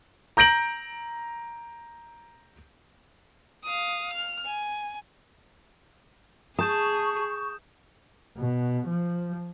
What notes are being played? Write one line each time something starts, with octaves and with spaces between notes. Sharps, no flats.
A#5 G6 A#6 D7 F#7
F5 D#6
F6
G#5
G#4 A5 C#6 D#6 G6 E7
B2
F3